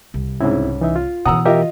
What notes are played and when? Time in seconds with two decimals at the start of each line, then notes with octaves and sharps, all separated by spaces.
0.14 C2
0.41 C#2 G#2 C4 E4
0.81 E3 D#4 E5
0.96 F4
1.25 B2 E3 F#5 A#5 D#6 E6
1.45 F4 G4 A#4 D#5 E5